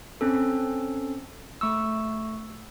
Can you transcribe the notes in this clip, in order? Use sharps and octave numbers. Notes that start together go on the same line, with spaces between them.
C4 C#4 A4
A3 C#6 E6